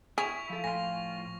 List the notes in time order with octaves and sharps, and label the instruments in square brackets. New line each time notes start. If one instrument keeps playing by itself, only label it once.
[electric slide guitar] E4 [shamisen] G#4 [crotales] C#6 F7
[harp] F3 A4
[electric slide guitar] A2 F4 [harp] G#5 [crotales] A#6